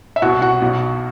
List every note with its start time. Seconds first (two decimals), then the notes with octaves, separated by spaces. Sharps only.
0.16 E5
0.22 C2 B2 F#4 F#5
0.42 F#4 F#5
0.61 B1 B2